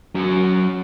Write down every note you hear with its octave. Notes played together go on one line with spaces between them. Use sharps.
F#2 F#3